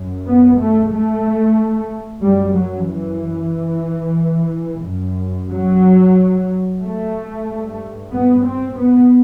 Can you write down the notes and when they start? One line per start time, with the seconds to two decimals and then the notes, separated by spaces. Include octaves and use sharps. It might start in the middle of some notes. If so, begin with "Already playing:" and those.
Already playing: F#2
0.26 B3
0.59 A3
0.91 A3
2.22 F#2 G3
2.56 F#3
2.89 E3
4.84 F#2
5.51 F#3
6.82 A3
7.48 G2
8.13 B3
8.46 C4
8.78 B3